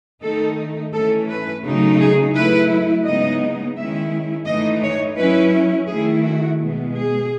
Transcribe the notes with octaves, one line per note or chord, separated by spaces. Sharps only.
D#3 A3 D#4 A4
E3 A3 C#4 A4
B4
C#3 F#3 A3 D#4
G#4
F#3 A3 E4 B4
C#3 G#3 B3 D#4 D#5
D#3 G#3 C#4 E4 E5
E3 A3 D#4 D#5
C#5
F#3 C#4 E4 B4
D#3 A3 E4 G#4
F#4
B2 G#3 B3
G#4